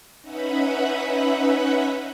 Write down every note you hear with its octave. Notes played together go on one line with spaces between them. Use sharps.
C#4 D#4 B4 E5 F#5 B5